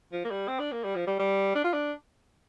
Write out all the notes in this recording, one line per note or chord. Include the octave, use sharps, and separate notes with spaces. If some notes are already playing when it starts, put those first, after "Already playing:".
F3
A#3
G3
C4
D4
A#3
G3
F3
G3
G3
D4
F4
D4